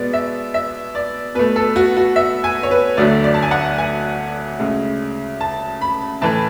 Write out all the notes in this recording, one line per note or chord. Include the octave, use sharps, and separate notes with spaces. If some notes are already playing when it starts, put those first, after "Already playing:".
Already playing: B2 G#3 B3 D5
E5
E5
D5
B2 A3 B4
A4
F#4
F#4
E5
G#5
C#5
B4
D2 D3 F#3 A3 D5
D5
A5
G#5
F#5
G#5
D2 C#3 G#3
A5
B5
A2 E3 A3 A5